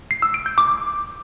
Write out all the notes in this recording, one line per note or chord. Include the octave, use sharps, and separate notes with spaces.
C7
E6
D7
G6
D6